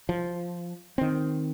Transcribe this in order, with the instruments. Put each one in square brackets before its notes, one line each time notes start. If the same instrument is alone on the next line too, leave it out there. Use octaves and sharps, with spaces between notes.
[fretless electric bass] F3
D#3 C4